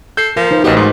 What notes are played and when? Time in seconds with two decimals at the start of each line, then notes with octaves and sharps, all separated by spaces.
0.17 A4 G6 C7
0.36 F3 A#4
0.51 D#4 B4 C5
0.64 A1 B3 F#4 G4 C5 D#5
0.77 G#2 G#4